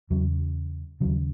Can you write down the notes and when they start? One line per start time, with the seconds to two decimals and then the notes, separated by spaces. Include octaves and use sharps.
0.10 E2 C#3 F#3
1.00 D#2 C#3 F#3